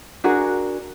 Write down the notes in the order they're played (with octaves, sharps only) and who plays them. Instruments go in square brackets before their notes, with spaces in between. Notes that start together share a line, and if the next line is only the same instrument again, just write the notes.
[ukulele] D4 F#4 G#4 A#4